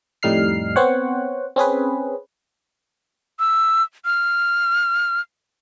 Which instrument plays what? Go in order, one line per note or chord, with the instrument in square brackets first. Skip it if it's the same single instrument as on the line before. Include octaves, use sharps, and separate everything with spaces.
[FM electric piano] F2 A2 G3 D#4 F6 C7
B3 C4 C5 C#5 F#5
C4 C#4 G#4 B4
[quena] E6
F6